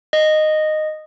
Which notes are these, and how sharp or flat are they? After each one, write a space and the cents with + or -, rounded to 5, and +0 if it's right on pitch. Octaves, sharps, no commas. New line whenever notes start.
D#5 -10